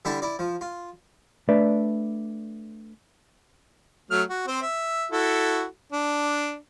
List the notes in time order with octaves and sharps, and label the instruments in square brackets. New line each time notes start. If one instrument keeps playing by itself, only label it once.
[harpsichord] D3 G3 D4 E4 E5 A5
E4 D5
F3
F4
[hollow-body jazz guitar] A3 D4 B4 D5 E5
[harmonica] F#3 A3 F6
F#4
C4 C5
E5
E4 F#4 A4
D4